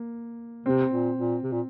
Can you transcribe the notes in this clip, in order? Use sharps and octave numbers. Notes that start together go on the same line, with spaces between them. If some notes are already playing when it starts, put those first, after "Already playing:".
Already playing: A#3
C3 C4
A#2
A#2
C3
A#2